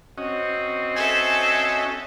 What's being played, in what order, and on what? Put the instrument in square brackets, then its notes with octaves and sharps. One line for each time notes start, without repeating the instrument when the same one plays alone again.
[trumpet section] C4 [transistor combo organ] C#4 F#4 D#5
[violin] A4 E5 [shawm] G#5